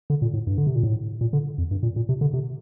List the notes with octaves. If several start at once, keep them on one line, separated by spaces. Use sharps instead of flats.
D3
A#2
A2
G2
D3
C3
A#2
A2
A#2
D3
F2
G2
A#2
A#2
C3
D3
C3